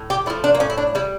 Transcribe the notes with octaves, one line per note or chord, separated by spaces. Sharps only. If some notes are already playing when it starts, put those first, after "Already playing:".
Already playing: A2
G4
F3 A3 E4
D4
A#3
A2 C#4
E4
D4
G3 E4